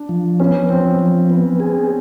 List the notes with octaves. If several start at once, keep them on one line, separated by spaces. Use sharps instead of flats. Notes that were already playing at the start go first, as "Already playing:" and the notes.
Already playing: D4
F3
B3 C#4
F3 C4
F3
B3
G#4